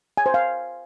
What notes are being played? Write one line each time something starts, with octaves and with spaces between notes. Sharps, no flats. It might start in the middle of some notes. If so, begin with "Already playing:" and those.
G#5
C5
F5